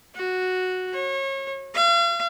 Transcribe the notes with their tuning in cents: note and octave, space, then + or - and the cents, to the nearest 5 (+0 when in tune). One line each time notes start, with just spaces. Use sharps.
F#4 -5
C#5 -35
F5 -40